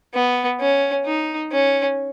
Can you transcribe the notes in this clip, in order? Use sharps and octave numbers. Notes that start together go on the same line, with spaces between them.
B3
C#4
D#4
C#4